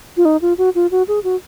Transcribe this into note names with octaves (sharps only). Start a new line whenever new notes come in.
F4
D#4
F4
F#4
F4
F#4
G#4
F#4